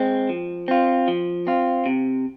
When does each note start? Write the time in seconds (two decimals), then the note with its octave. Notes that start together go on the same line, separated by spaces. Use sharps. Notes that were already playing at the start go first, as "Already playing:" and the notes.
Already playing: G#3 C4
0.29 F3
0.68 C4 F4
1.08 F3
1.47 C4 F4
1.86 C3